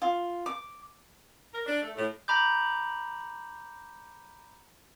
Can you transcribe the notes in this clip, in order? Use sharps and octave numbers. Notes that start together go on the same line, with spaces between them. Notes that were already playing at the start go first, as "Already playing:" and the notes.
F4
D6
A#4
D4
A3
A2
A#5 B5 D6 G6